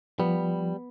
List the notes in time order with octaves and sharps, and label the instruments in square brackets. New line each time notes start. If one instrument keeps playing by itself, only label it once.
[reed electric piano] F3 [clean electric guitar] G3 [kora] B3